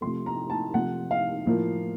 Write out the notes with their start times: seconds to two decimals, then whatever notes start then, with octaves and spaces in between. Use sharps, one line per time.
0.01 C3 F3 A3 C6
0.26 A#5
0.50 A5
0.74 C3 F3 A3 F#5
1.11 F5
1.46 A2 F3 A#3